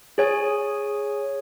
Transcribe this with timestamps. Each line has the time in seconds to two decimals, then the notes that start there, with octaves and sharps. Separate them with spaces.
0.18 G#4 C#5 G#5